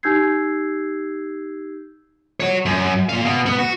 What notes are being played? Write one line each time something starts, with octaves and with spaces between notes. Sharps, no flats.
D#4 G4 E6 G6 G#6 C7
F#4 C#5
F#2
A#2 F5
B2
B3
F#4